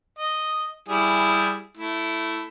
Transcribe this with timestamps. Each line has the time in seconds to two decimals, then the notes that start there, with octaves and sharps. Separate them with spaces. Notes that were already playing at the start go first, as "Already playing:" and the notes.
0.19 D#5
0.89 G3 E4 G#4
1.77 A3 E4